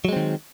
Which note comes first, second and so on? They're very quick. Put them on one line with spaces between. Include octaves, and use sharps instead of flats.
F#3 G#3 C4 D#3